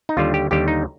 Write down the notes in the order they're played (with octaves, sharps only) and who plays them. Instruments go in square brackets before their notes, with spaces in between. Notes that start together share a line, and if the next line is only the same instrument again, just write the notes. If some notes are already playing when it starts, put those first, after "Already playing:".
[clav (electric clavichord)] D#4
D#2 D3 G3 F4
G4
D#2 D3 G3 G4
D#4